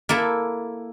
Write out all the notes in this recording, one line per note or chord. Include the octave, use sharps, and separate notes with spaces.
A#3 E4 A4